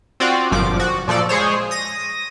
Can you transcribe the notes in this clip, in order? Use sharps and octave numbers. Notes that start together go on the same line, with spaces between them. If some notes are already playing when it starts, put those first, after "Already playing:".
C4 F4 F#4 D5
G1 A#2 F3 D6
F#4
A#2 F3 A4 D5
G#3 G#4 C5 C#5
D#6 A#6